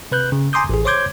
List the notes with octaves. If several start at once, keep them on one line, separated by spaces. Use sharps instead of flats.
C3 B4 F#6 G6
C#3
G#5 A#5 C6 D6 D#6 G6
A1 G#4
C5 C#5 C6 D6 G6 G#6